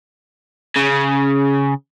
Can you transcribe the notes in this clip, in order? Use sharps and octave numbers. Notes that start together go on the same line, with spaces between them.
C#3